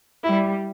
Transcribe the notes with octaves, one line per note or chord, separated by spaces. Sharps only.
G3 E4